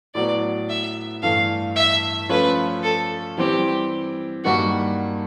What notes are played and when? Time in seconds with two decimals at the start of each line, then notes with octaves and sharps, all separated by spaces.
0.15 A2 F#3 B3 D5
0.69 E5
1.23 G2 E3 A3 F5
1.76 E5
2.29 F3 A3 C#4 F4 B4
2.83 A4
3.38 E3 G3 C4 G4
4.45 G2 D#3 G3 A#3 F#4